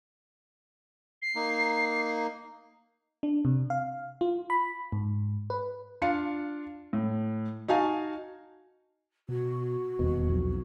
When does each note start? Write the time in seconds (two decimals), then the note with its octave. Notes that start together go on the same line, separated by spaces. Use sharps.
1.22 C7
1.36 A#3 D#4
3.23 D4
3.45 C3
3.70 F5
4.21 F4
4.50 B5
4.92 G#2
5.50 B4
6.02 D4 F4 F5 C#7
6.93 A2
7.68 D#4 F#4 F5 G#5 A5
9.29 B2 F#4
9.99 D#1 E2 B2
10.29 B1 F2